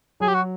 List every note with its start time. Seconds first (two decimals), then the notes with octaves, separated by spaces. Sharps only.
0.20 F#3 G#4
0.28 G4
0.34 F#4